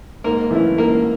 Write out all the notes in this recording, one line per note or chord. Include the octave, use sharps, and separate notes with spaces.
G#2 A#3 A#4
E3 A3 C#4 E4
G#2 A#3 A#4